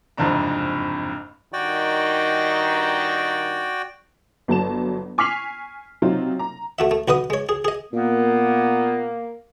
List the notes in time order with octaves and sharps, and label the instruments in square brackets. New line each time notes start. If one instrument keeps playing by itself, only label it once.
[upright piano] F#1 F2 G#2 C3 D4 A#5
[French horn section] G2 D#3 [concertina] F#4 D5 G5
[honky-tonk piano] G1 F#3 A5 E7
G#5 C#6 F6 B6 C7 F7
C3 F#3 C4 D#4 F4
A#5
[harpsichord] A3 F#4 E5
A3
B1 F#4 B4 D#5 D#6
G#3 C#5
G#4
G#4 D#5
[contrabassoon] A#2 [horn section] A#3 [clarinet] B3